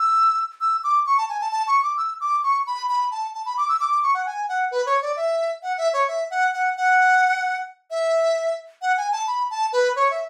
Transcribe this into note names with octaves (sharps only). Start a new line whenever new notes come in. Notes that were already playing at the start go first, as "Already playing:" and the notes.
Already playing: E6
E6
D6
C#6
A5
G#5
A5
A5
C#6
D6
E6
D6
C#6
B5
B5
A5
A5
B5
D6
E6
D6
D6
C#6
F#5
G#5
F#5
B4
C#5
D5
E5
F#5
E5
C#5
E5
F#5
F#5
F#5
E5
F#5
G#5
A5
B5
A5
B4
C#5
E5